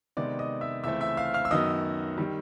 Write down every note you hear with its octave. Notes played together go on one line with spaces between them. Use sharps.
C3 D#3 G#3 B3 D5 D6
D#5 D#6
E5 E6
C#2 C#3 E3 A3 C4 E5 E6
E5 E6
F5 F6
F5 F6
E6
F#2 D#3 F#3 B3 D#5 D#6
D#3 G3